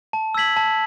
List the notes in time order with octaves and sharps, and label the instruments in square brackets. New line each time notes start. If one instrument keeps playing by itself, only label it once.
[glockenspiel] A5
E6 G#6 B6 F#7
A5